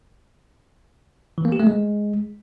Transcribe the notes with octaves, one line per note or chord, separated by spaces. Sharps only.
E3
A#3
G4
A3
G#3